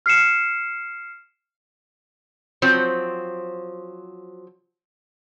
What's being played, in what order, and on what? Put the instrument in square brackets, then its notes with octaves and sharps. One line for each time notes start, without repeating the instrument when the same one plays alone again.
[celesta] F6 C7 C#7 E7
[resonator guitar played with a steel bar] F3 F#3 C4